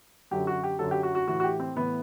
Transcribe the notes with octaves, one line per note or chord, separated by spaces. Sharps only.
F#2 D3 F#3 G4
F#4
G4
F#2 D3 F#3 A4
G4
F#4
F#4
A2 E3 F#4
F#4
G4
C4
A2 E3 B3